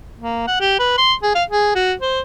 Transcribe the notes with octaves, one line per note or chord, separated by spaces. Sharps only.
A#3
F#5
G4
B4
C6
G#4
F5
G#4
F#4
C5